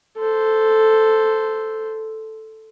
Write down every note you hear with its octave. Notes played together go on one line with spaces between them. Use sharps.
A4 C5